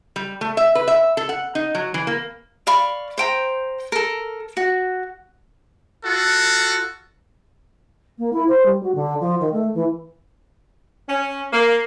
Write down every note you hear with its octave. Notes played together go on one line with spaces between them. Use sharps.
G3
A3
E5
B4
E5
A4
F#5
D#4
F#3
E3
A#3
D5 F5 B5 C#6
C5 G5 A#5
A4 A#4
F#4
F4 F#4 A4
A#3
E4
C5
G3
F#4
D3
F3
D#3
A3
E3
C#4
A#3